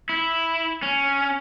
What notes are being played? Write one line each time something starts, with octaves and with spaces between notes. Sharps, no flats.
E4
C#4